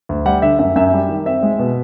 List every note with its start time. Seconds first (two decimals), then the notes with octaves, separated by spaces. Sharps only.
0.09 D2
0.26 G3 F#5
0.42 D3 E5
0.59 F#2 E5
0.76 F#2 E5
0.93 G3
1.09 D#3
1.26 C4 E5
1.43 G#3
1.59 B2